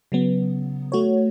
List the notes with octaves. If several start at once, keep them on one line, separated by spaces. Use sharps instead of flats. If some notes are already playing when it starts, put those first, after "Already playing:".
C#3 F#3 B3
A3 F#4 C#5